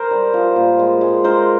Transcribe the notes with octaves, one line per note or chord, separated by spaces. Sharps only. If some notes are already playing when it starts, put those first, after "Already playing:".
Already playing: A#4 C5
G3
F3
A#2
G#3
G#3
G#3 A#4 C5